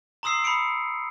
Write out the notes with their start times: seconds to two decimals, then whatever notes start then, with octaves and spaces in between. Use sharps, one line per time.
0.23 A#5 C6 D#6 E6 C7
0.44 B5 D#6 C#7 D7